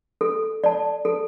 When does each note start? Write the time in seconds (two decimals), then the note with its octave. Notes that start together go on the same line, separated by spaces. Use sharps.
0.21 A4
0.64 D5 A5
1.05 A4